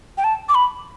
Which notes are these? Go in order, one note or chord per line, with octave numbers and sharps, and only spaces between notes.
G5
A5
D6
B5